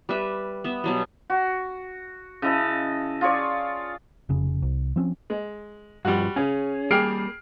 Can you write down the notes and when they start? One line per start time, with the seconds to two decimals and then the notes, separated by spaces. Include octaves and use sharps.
0.09 G3 B4 E5
0.64 B3 E5
0.84 B2 F#3 G3
1.30 F#4
2.42 C#3 E4 D#5 A5
3.21 F4 G#4 C#5 D5
4.29 F1 C#3
4.62 C2
4.96 F3 C4 C#4
5.30 G#3
6.05 G2 F3 G3 F#4
6.36 C#3 C#4 G#4
6.91 G3 A#3 G#4 G5 F6 C7 D7